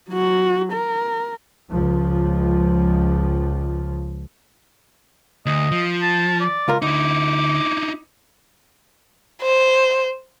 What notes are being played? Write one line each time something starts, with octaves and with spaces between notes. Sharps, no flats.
F#3 F#4
A#4
C#2 F3
D2 D#5
F3
A5
D5
C#2 F4 A#4
D2 D#4 E4 D6
C5